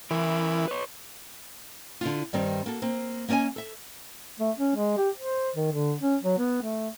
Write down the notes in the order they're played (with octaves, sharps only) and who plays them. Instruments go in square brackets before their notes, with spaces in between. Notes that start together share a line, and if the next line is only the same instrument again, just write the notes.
[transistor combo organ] E3 [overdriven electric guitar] E4 A#4
[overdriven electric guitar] B4 C#5
[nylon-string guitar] D3 E4 F4
G2 D#3 G3 C4
A#3 F#4 A4
A#3 C4
A#3 C#4 D5 D#5 G#5
A4 E5
[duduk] A3
C#4
G#3
G4
C5
D#3
D3
C#4
F#3
B3
A3